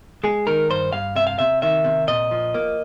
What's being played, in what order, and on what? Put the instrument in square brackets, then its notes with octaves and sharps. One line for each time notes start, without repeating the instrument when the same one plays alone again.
[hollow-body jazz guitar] G#3 [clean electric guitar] G#4
[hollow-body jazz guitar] D#3 [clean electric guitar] A#4
[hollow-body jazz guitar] G2 [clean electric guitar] C5
[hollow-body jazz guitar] G2 [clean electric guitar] F5
[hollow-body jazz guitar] C3 [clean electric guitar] E5
[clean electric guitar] F5
[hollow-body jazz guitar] C3 [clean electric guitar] E5
[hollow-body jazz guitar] D#3 [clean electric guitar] E5
[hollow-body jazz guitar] C3
[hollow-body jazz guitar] A#2 [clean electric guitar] D#5
[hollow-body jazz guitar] F3
A#3